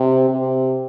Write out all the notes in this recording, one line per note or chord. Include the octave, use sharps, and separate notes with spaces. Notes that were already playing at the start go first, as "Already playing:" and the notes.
Already playing: C3
C3